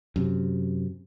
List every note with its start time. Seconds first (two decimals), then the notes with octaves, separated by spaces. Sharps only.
0.16 F#2 C3